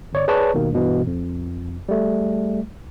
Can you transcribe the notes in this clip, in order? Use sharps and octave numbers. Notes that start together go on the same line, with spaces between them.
G1 C#5 D5
G#4 B4 C#5 D5 A5 C#6
D#2 B2 D#3 A#3
G2 B2 E3
F2
G3 A3